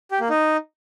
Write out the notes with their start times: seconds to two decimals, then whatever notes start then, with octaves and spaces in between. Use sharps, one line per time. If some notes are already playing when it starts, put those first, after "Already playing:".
0.11 G4
0.20 A#3
0.30 D#4